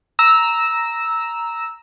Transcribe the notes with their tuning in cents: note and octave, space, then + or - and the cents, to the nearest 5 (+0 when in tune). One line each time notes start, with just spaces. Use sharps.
A#5 +0 E6 -10